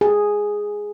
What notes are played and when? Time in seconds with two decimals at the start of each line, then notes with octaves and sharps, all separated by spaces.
0.01 G#4